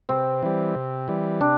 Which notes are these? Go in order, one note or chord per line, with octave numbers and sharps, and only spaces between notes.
C3 C4
E3 G3
C3
E3 G3
C3 D4